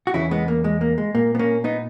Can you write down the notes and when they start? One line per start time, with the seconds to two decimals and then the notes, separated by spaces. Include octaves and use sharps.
0.07 F#4
0.14 E2 C#3 E3 C#4 E4
0.31 G#3 B3
0.48 A#3
0.64 G#3
0.81 A#3
0.98 G#3
1.15 A#2 A#3
1.35 B3
1.39 A#3 C#4
1.64 B3 D#4